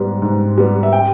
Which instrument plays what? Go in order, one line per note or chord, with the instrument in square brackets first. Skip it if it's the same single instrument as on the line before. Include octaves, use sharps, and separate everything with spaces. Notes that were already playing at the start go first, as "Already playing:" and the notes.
Already playing: [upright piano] G#2 G3 B3
G#2
G3 B3
E5
G5